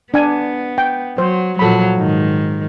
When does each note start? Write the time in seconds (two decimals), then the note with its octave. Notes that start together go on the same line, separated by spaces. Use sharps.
0.14 B3 D4 G#5
0.78 G5
1.18 F#3 C5
1.59 A#2 F3 F#3 A4 B5
1.97 G#2 D#3